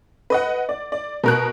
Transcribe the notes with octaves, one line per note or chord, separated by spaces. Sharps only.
B4 D#5 F#5
D5
D5
B2 A#4 F#6